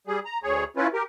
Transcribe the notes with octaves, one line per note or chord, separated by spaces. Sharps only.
G3 G#4
A#5
D2 G#4 C#5
C#4 E4 F4 B4
G4 A#4